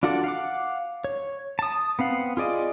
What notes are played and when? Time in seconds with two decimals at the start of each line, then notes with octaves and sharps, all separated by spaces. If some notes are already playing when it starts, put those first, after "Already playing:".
0.03 D4 F4 F#4 A4 D5
0.24 F5 F#5 D6
1.04 C#5
1.59 A5 D#6
1.99 B3 C4 F5 F#5
2.37 F4 G#4 D5 D#5